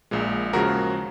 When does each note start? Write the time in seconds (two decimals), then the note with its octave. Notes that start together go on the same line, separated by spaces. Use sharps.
0.11 A#1 A#2 G#3
0.53 D#2 C#3 F3 G#3 F#4 A#4